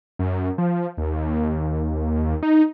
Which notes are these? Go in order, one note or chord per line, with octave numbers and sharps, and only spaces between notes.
F#2
F3
D#2
D#4